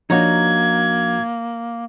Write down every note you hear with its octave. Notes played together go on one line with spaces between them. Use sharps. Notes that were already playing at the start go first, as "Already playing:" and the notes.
F3 A#3 D4 D#4 F#4 C#5 G#6